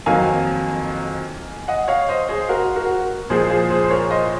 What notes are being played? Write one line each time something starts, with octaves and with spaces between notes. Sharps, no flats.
F2 D#3 F#3 A#3 F5 G#5
D#5 F#5
C#5 F5
C5 D#5
G#4 C5
F#4 A#4
F#4 A#4
A#2 F3 G#3 G#4 C5
G#4 C5
G#4 C5
C5
A#4 C#5
C5 D#5